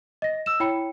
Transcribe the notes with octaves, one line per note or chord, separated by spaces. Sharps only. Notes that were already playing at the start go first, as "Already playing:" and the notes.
D#5 A#6
E6 E7
E4 C#5 G5 B5 C#7